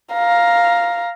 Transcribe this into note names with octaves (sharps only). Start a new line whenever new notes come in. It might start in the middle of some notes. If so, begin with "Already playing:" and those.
F5 A#5